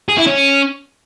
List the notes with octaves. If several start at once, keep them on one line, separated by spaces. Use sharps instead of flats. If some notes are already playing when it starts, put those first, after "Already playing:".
G#4
E4
C#4